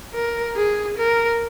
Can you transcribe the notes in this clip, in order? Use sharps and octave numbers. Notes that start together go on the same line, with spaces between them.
A#4
G#4
A#4